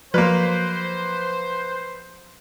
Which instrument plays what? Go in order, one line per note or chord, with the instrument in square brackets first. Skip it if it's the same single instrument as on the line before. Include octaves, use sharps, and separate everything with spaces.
[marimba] F3 [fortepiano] F#3 A#3 [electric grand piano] B4 [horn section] C5